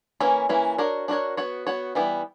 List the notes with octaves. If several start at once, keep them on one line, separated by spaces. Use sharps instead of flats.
E3 A#3 C#4 E4
E3 A#3 C#4 E4
D4 F#4 A#4 C#5
D4 F#4 A#4 C#5
B3 F#4 C#5
B3 F#4 C#5
E3 G3 B3 E4